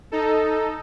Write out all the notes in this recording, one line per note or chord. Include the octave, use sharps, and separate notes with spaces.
D#4 A4